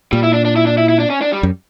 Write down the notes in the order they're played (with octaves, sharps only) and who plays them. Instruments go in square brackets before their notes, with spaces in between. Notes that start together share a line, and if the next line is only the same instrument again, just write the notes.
[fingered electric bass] A#2 [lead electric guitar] G3
[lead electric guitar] E4
D4
D4
E4
D4
E4
E4
D4
C#4
D4
G3
[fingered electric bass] F#2